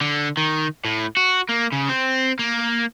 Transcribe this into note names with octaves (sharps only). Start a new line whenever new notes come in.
D3
D#3
A2
F#4
A#3
C#3
C4
A#3